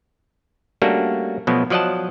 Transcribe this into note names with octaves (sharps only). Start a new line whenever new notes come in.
G3 A3 A#3 C#4 D4 F#4
B2 F3 F#3 A3 B3
F3 F#3 D5 D#5 F#5 A5